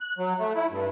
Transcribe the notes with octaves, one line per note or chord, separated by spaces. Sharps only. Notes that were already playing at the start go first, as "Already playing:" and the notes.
F#6
F#3
A3
E4
G2